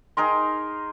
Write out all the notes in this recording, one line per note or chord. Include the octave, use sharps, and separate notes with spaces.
D#4 G#4 A#4 C6